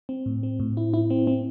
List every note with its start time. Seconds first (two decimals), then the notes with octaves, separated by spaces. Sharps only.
0.09 C4
0.26 A2
0.43 C4
0.60 A2
0.77 E4
0.94 E4
1.10 C4
1.27 C4